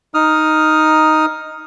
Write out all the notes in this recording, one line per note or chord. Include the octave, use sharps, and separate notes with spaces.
D#4 D#6 F6